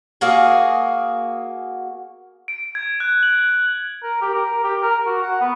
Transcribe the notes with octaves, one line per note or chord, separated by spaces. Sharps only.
A#3 F#4 G#4
D7
G#6
F#6
F#7
A#4
G4
A#4
G4
A#4
F#4
F#5
B3